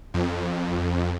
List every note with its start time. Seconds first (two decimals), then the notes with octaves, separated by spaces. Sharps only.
0.14 F2